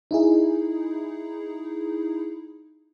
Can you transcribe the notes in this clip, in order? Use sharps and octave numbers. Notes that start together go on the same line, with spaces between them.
D#4 E4 G#4